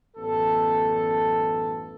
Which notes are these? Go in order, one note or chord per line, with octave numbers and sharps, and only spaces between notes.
A1 F#2 B3 A4